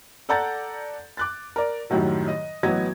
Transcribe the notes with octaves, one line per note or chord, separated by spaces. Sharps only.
A4 D5 F#5 A#5 G6 A6
D6 F#6 A6
A#4 D5
F#2 A2 D#3 F#3 G3
D#5
A1 F#3 B3 D#5 G#6 A#6